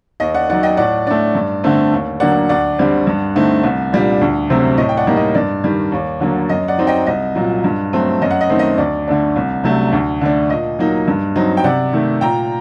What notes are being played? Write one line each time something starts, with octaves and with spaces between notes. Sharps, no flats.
D#2 D#5
D5 F#5
D#3 F#3 D5 F#5
D#5 G5
A2 D5 F#5
A3 D4 D5
G2
D3 A3 C4
D#2
D3 F#3 A#3 D5 F#5
D2 D5 F#5
D3 G3 C4
G2
D3 A3 C4 D#4
C2
A#2 G3 D4
D2
C3 F#3 A3 C4
A2 D#5
G5
D5 F#5
G3 A#3 D#4
D#5
G2 D5
D#3 G3
D#2
D3 F#3 A#3
F#2 D#5
D5 F#5
F#3 C4 D#4
D#5 G5
C2 D#5
A#2 F#3
G2
F#3 A3 C4
F#2 D#5
F#5
D#5
D#3 A3 C4
D#5
D2 D5
D3 A3 D4
C2
C3 F#3 A3 D4
D2
D3 A3 D4
A#2 D#5
F#3 A#3 D#4
G2
F#3 C4 D#4
G5
C3 D5 F#5
D#3 A3
A#2 G5 A#5